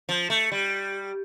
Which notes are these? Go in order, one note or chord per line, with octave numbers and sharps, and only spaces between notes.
F3
A3
G3